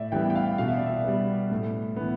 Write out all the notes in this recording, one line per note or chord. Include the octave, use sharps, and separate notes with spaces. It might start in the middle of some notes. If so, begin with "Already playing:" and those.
Already playing: A2 D5 E5
E3 G3 B3 G5
G5
F5
B2 F5
E5
D5
E5
G3 B3
A2
E3 B3